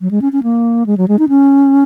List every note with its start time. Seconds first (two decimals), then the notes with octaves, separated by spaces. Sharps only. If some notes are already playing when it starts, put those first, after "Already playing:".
0.01 F#3
0.11 G#3
0.22 C#4
0.33 C#4
0.43 A#3
0.86 G#3
0.97 F#3
1.08 G#3
1.19 D#4
1.29 C#4